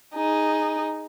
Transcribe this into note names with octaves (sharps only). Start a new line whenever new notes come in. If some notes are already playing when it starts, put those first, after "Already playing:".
D#4 G#4